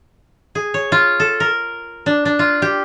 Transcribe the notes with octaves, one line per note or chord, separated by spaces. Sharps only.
G#4
C#5
F4
A4
A#4
D4
D4
F4
G4